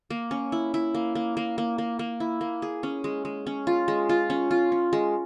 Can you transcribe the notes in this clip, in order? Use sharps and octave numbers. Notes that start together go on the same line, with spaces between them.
A#3
C#4
E4
E4
A#3
A#3
A#3
A#3
A#3
A#3
E4
A#3
G#4
C#4
G#3
G#3
C#4
F4
G#3
F4
C#4
F4
C#4
G#3